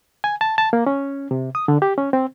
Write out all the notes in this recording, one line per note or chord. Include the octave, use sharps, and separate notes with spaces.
G#5
A5
A5
A#3
C#4
C3
D#6
D3
G4
C#4
C4